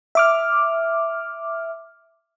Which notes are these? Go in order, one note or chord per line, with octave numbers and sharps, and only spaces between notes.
E5 D6 F6